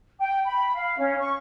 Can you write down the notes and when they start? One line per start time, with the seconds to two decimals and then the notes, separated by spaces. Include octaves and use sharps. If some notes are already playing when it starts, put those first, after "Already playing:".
0.20 G5
0.46 B5
0.75 F5
0.98 C#4
1.20 C#6